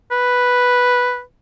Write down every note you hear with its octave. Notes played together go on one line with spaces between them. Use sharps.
B4